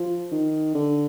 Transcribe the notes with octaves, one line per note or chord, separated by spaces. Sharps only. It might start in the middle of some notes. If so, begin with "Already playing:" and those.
Already playing: F3
D#3
D3